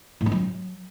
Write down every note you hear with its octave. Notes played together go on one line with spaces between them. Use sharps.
A2
D4
F#3